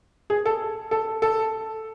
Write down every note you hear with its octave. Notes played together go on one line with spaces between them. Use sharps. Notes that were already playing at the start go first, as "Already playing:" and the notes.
G#4
A4
A4
A4